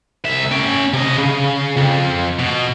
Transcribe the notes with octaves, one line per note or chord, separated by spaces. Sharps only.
C2 E5
C#4 G5
C3 D#5
C#3
F2
B2